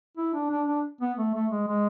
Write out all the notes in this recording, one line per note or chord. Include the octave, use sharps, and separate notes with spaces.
E4
D4
D4
D4
B3
A3
A3
G#3
G#3